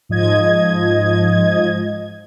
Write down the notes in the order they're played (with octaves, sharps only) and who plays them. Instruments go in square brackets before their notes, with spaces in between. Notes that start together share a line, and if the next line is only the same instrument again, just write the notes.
[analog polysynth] G#2 F3 D#5 G#6